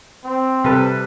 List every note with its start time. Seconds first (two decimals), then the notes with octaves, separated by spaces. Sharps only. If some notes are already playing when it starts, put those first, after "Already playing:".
0.24 C4
0.64 C3 G3 A4 B4